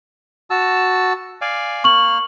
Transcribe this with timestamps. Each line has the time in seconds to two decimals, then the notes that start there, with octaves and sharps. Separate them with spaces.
0.50 F#4 A5 E6
1.41 D5 F5 G#5
1.84 A#3 C#6 F6 F#7